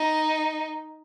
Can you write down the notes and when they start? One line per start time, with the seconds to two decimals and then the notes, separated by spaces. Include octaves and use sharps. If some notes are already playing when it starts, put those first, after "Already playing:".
Already playing: D#4